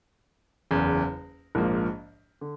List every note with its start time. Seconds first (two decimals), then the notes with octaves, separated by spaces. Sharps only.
0.71 F#1 E2 C#3
1.55 A#1 G#2 F3 A#3
2.41 D3